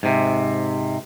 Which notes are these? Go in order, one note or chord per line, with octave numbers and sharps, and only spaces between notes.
G#2 C3